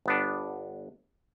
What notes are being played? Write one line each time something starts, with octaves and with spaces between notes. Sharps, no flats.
G1 B3 D4